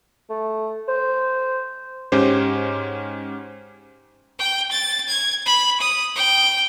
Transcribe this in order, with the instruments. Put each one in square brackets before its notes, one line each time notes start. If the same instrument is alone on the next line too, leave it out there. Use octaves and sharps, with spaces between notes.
[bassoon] A3
C5
[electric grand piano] G#2 C#4 G4 C5
[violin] G5
A6
G#6
B5
D#6
G5